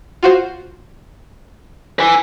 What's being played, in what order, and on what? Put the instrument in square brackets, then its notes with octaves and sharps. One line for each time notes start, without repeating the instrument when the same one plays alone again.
[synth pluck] F4 F#4 C5
[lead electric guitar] B4 G#5